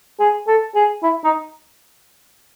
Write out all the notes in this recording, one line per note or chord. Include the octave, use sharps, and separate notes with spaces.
G#4
A4
G#4
E4
D#4